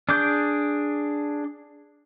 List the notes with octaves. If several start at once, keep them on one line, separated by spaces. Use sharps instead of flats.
D4 G#4 D6 G6